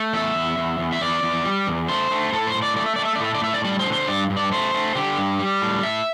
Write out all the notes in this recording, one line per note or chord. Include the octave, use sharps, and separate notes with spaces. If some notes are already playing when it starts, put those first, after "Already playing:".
Already playing: A3
E2 E5
E2
E2
E2
E5
E2 D5
E2
G3
E2
A3 C5
A3
A2 A4
C5
A2
D5
A3 D5
E5
A3 D5
E5
D5
A2 E5
D5
A2 E5
D5
G3 D5
C5
D3
C5
G2 D5
G2
D5
A3 C5
A3
D3 G4
G2
G3
A2
A2 E5